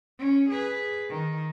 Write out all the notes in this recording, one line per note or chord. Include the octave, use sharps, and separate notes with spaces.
C#4
G#4 B4
D#3